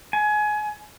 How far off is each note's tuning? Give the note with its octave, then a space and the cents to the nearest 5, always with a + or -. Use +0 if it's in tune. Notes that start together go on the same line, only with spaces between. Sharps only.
G#5 +25